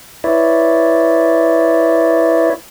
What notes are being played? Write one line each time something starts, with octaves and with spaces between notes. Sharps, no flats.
E4 B4 C#5 D5 E5